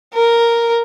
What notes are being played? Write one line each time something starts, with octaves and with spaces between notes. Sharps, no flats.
A#4